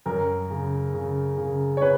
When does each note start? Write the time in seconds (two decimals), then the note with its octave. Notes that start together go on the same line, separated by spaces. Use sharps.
0.06 F#2 A#4
0.50 C#3
0.94 C#3
1.38 C#3
1.77 C#5
1.82 C#3 B4